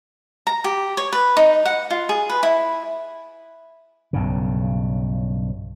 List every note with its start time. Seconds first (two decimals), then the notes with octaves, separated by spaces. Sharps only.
0.47 A#5
0.64 G4
0.97 C#5
1.13 B4
1.37 D#4
1.65 F#5
1.90 F4
2.09 G#4
2.30 B4
2.43 E4
4.13 B1 G2 C#3